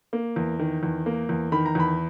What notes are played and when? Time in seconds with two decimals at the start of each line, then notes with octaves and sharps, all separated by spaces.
0.13 A#3
0.36 E2
0.59 D#3
0.83 E2
1.06 A#3
1.29 E2
1.52 D#3 B5
1.66 A#5
1.75 E2 B5